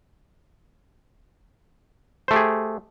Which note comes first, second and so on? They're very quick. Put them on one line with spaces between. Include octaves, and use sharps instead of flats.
C5 A3 G4 G#4